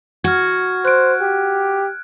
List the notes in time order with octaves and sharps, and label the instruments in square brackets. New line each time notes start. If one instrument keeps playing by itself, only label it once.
[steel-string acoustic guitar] F#4 [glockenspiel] F6 G#6
[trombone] C5 [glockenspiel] F#6 D7
[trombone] G4